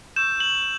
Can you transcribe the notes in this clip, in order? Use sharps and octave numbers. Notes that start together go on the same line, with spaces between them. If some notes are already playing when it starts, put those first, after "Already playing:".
C#6 E6 G6 E7
F#7